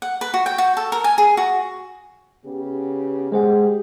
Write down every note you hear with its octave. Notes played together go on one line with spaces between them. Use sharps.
F#5
B4
F#4
G5
F#4
A4
A#4
G#5
G#4
F#4
C#3 B3 G4
G#3 G4 G#4 C5 F#5